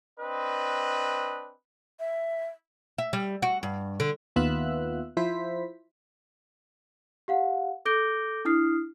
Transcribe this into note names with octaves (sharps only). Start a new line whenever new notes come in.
C4 D4 B4 D#5
E5
E5
G3
F#4
G2
D3
D#2 B3 F4 E5 E6 F#6
F3 E4 C5 B6
G4 F5 F#5
A4 D6 G6 A#6 D7 G7
D4 E4 D#6 F6 C7